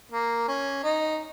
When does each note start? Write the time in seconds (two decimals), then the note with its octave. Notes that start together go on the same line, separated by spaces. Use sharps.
0.12 A#3
0.48 C#4
0.84 D#4